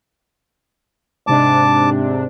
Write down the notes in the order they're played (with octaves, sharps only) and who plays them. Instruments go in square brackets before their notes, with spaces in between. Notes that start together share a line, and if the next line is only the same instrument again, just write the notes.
[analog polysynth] G#2 C3 D4 [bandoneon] A5 D6